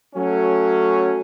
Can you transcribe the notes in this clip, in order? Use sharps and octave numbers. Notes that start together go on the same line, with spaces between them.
F#3 A3 C#4